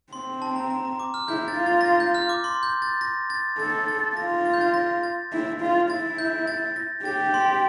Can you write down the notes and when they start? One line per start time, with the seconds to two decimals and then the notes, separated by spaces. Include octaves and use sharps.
0.13 C4 C6
0.42 A5
0.56 A#5
0.70 A#5
0.85 A#5
1.00 D6
1.14 F6
1.28 E4 G6
1.48 A6
1.56 F4
1.66 A6
1.81 A#6
1.86 A6
2.00 G6
2.15 F6
2.29 D6
2.44 C6
2.63 G6
2.82 A6
3.01 A#6
3.30 A6
3.59 A4 A6
3.88 A6
4.16 F4 A#6
4.46 A6
4.53 G6
4.61 A6
4.74 A#6
5.03 A6
5.32 E4
5.61 F4
5.90 E4 A6
6.18 G6
6.47 A6
6.76 A#6
7.05 G4 A6
7.34 C6